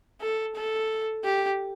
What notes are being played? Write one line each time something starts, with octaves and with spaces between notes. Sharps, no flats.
A4
A4
G4